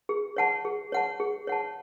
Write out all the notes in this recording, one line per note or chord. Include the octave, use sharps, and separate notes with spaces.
G#4
C#5 F#5 A5
G#4
C#5 F#5 A5
G#4
C#5 F#5 A5